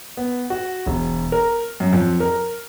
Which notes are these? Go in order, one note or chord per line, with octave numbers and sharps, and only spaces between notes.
B3
F#4
E1
A#4
F#2
F2
A#4